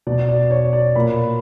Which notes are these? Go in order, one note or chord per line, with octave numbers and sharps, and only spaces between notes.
B2 D5
D5
C#5
D5
A#2 B5